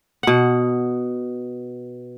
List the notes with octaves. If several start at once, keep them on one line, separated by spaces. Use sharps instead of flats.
B2 F#5